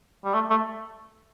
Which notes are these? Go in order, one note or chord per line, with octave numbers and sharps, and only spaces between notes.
G3
A3
A3